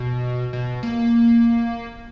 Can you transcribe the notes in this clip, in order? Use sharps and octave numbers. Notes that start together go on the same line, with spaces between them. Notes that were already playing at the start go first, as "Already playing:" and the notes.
Already playing: B2
B2
A#3